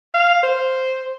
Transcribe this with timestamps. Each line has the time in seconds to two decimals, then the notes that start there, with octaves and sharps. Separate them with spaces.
0.14 F5
0.43 C5